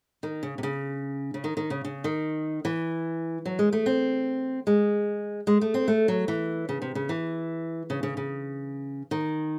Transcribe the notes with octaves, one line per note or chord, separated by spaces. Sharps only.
D#3
C#3
C3
C#3
C#3
D#3
D#3
C#3
C#3
D#3
E3
F#3
G#3
A3
C4
G#3
G#3
A3
C4
A3
F#3
E3
C#3
C3
C#3
E3
C#3
C#3
C#3
D#3